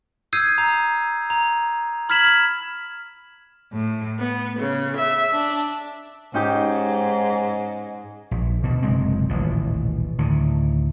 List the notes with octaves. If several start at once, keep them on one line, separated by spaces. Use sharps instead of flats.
D#6 E6 G6 G#6 C7 D#7
A#5
A#5
B5 F6 G#6 B6 E7 F#7
A2
B3
C#3
E5
D4
G#2 C#4 D#4 G4
A#1
D2 B2
F#1 C3 G#3 C4
D#1 A1 B2
D2 A2 D#3